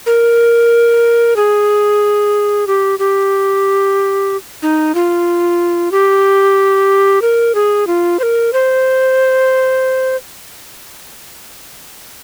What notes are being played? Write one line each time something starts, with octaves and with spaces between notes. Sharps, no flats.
A#4
G#4
G4
G4
D#4
F4
G4
A#4
G#4
F4
C5
A#4
C5